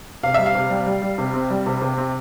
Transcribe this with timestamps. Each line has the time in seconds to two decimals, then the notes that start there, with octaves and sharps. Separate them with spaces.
0.23 C3 F5
0.34 G3 E5
0.46 F5
0.55 C3
0.70 G3
0.87 G3
1.02 G3
1.18 C3
1.34 C4
1.50 G3
1.66 C3
1.82 C3
1.97 C4